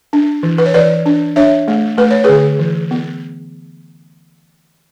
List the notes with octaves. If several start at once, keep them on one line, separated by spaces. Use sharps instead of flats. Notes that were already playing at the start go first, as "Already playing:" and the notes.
D4
E3
B4
C#5
E3 B4 D5
D4
D4 C#5 E5
A3
A3 B4
C#5
D3 G#4 B4
E3
B3